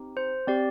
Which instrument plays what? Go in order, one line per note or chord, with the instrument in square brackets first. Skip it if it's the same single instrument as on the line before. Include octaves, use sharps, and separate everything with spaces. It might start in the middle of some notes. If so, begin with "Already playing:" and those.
Already playing: [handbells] C4 D#4 G4
C5
C4 G4 D5